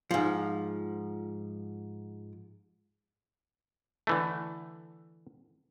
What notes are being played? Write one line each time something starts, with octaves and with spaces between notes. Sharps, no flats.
G#2 F3
D3 E3 A3